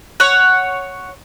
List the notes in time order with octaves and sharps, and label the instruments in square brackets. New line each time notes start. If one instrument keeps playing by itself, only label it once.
[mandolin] C#5 F#5